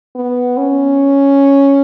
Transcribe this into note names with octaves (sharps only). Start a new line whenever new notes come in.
B3
C#4